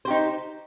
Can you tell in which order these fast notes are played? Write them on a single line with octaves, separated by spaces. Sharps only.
C5 G4 D#4